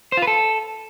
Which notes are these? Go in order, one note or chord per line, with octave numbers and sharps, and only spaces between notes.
C5
F4
B4
A4